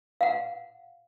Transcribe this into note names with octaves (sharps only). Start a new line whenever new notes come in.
F5 F#5